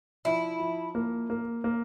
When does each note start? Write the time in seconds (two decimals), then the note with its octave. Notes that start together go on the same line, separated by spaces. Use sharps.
0.25 F3 E4
0.60 F3
0.95 A#3
1.30 A#3
1.64 A#3